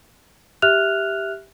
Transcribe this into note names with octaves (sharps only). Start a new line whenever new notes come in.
G4 E5 F6 F#6 F7